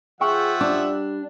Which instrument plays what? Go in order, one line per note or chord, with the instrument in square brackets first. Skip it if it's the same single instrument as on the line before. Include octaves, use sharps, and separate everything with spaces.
[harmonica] F3 E5 F#5 [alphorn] G#4 [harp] G5 C#6 F6
[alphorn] G3 [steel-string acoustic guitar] D4 [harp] D6